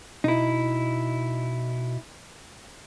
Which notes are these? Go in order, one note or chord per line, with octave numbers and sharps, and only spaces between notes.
B2 D#4 E4